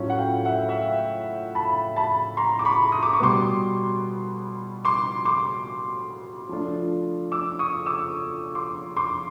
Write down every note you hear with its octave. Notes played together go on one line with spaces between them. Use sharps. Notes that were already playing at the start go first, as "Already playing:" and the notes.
Already playing: A2 F#3 A3 C#4 F4
F#5
F5 G5
E5 F#5
E5
F5
A5 B5
A5 B5
A#5 C6
D6
B5 C#6
D#6
D6
C#6
B2 G3 B3 C6 D6
C6 D6
C6 D6
F3 A3 D4 F4
D6 E6
C#6 D#6
D6 E6
C6 D6
C6 D6